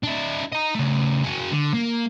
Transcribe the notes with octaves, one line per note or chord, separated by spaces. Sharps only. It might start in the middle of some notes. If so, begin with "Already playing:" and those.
D4 E4
D#5 A#5
C#3 A3
F#4 G#4
D3
A#3